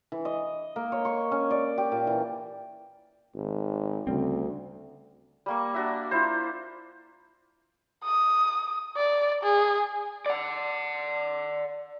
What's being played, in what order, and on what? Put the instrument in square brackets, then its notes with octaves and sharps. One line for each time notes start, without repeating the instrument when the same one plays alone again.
[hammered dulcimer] E3
D#5
A#3
C#5
C#6
C#4
D5
G4
A#2
E3
[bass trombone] G#1
[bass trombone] D2 [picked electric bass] C#3 G3 C4
[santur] G3 A#3 C#6
D4 F#4 E5
E4 F4 C5
[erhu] D#6
D5
G#4
[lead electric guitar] D5 F#5